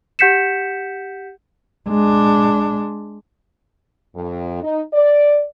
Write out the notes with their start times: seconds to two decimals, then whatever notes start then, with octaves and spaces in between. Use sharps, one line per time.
0.19 G4 F#5 G6 B6 C#7 E7
1.88 G#3 D4
4.16 F2
4.63 D#4
4.93 D5